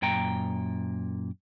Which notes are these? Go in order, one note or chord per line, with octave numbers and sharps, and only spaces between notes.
F#2 A#2 G5 A#5